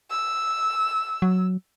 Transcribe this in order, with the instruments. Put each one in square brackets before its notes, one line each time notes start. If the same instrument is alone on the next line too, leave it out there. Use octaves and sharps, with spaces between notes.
[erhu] E6
[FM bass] F#3